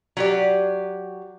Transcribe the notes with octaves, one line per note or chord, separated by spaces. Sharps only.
F#3 G4 D5